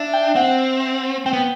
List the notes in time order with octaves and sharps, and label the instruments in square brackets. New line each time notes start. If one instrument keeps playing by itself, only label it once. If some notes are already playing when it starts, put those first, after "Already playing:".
Already playing: [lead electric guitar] D4 [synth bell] E5
[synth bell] G5
[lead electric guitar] C4 [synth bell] F#5
[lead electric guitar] C4 [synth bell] G5
[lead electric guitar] B3